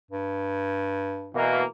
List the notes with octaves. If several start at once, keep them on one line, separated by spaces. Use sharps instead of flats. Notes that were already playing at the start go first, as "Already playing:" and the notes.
G2
B2 E3 A#3